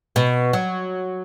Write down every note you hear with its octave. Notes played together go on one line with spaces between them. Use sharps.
B2
F#3